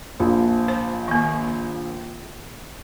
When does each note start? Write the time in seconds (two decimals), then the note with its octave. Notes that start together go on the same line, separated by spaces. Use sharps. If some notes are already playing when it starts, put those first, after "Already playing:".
0.20 A#1 F3
0.68 C5
1.08 D#3 A#3